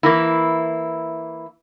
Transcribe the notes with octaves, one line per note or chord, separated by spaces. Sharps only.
E3 A#3 E4